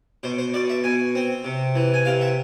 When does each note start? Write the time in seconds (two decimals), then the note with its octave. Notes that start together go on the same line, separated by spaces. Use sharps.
0.23 B2 C5
0.38 C5
0.54 B2 D5
0.70 E5
0.84 B2 G#5
1.15 C4
1.45 C3
1.75 E3
1.94 G#5
2.05 C3 F5
2.21 E5